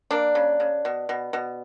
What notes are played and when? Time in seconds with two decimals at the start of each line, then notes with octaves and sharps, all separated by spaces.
0.11 A#3 D4
0.35 C#3
0.60 C#3
0.85 B2
1.09 B2
1.33 B2